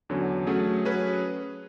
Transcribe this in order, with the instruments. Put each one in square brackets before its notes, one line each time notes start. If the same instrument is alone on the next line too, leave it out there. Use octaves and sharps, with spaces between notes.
[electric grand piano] E2 D3 F#3 C#4
F#3 A3 C#4 G#4
F#3 C#4 G#4 B4